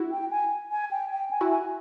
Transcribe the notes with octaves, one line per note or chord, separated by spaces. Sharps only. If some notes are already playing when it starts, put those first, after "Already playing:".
Already playing: E4 F#4
G5
G#5
G#5
G5
G5
G#5
E4 F#4
G#5